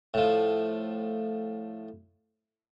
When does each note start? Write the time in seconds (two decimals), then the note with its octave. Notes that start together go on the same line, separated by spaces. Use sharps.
0.14 A2 F3